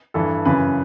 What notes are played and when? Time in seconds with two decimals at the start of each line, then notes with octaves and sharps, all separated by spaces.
0.14 G2 E3 A4
0.45 F#2 C#3 E3 B4